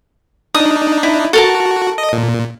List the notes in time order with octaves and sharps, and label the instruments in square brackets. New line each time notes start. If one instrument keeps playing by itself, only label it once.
[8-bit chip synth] D4 D#4 [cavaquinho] D#6
[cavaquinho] E4
[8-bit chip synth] F#4 [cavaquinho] A4 A#4 A5
[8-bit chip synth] D#5
A#2